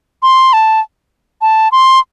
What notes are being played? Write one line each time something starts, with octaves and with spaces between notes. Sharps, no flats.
C6
A5
A5
C6